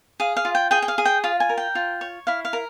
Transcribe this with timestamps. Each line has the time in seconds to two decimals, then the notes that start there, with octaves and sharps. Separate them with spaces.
0.20 G#4 F5
0.37 F5
0.45 F4
0.55 G5
0.71 G#4 G5
0.82 G5
0.88 F5
0.98 G#4
1.05 G5
1.24 F4 F5
1.40 G#5
1.49 A#4
1.58 G5
1.75 F4
2.01 C#5
2.27 E4 F5
2.45 F5
2.53 A#4